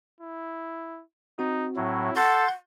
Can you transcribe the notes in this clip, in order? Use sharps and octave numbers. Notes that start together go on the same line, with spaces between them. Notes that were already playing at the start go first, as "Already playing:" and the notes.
E4
C4 D#4 F#4
A2 F#3 E4
A4 F#5 C6 G6 A6